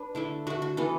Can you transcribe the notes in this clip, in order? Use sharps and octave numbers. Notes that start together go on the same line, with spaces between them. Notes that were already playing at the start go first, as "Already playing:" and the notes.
Already playing: D4 B4
D3 A3 E4
D3 A3 F#4
F#4
E3 B3 A4